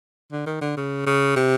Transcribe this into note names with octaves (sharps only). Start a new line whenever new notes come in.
D3
D#3
D3
C#3
C#3
C3